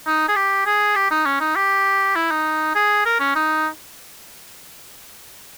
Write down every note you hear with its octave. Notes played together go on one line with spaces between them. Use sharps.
D#4
G#4
G4
G#4
G4
D#4
C#4
D#4
G4
E4
D#4
G#4
A#4
C#4
D#4